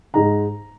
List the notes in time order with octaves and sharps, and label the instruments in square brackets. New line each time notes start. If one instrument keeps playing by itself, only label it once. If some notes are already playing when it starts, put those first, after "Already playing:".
[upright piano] G#2 G#3 D#4 A#5